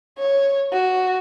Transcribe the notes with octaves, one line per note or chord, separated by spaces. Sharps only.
C#5
F#4